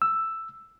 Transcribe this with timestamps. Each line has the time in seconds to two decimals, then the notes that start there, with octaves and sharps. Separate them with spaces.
0.02 E6